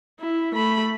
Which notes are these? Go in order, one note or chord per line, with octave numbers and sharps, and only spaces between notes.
E4
A3 B5